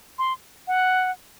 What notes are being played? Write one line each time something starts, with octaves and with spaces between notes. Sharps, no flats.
C6
F#5